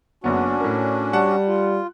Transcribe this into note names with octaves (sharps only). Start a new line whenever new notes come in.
F#1 B3 C#4 D4 F#4
A2 A#4
G3 F#5 A5 F#6
F4